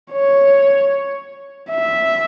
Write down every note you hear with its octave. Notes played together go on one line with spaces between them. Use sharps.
C#5
E5